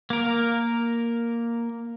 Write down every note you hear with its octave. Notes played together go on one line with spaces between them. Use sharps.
A#3 A#4